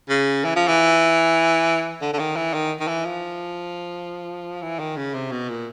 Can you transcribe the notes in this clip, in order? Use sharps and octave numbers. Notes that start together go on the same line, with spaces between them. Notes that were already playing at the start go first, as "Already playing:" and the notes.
C#3
E3
F3
E3
D3
D3
D#3
E3
D#3
D#3
E3
F3
E3
D#3
C#3
C3
B2
A#2